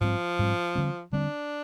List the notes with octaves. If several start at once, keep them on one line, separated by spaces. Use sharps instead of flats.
G#2 F3 G3 C4
G#2 G3 C4
D3 G3 C4
D3 G3 C4 D4